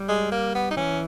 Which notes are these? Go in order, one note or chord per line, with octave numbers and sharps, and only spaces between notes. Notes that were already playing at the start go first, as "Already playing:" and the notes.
Already playing: G3
G#3
A#3
B3
D#4
E3 C#4